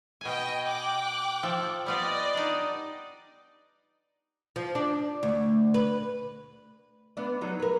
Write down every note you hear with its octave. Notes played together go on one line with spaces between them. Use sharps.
B2 D#5 G5 G#5
G5 D6 F#6
F3 A4
G3 B3 F4 D5 D#5
D4 D#4
F3
D4
D2
B4
B3 D4 D5
F#3 D#4
A#4 B4